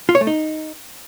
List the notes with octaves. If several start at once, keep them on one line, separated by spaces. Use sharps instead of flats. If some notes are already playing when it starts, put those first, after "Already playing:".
F4
C#5
A3
D#4